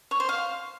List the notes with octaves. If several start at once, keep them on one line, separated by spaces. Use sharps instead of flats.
C#5
C5
F5